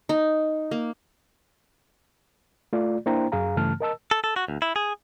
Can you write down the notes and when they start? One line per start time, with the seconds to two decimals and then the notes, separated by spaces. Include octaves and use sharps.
0.09 D#4
0.71 A#3
2.73 A3 F4 D5
3.06 A#3 D4 E4 C5 G5 A#5
3.32 F#2 G#4 F5 A#5
3.56 G2 C#3 E3 A3 A5 F6
3.80 A#4 D#5 A5 E6
4.11 A4
4.24 A4
4.36 F#4
4.48 D2
4.62 E4
4.76 G#4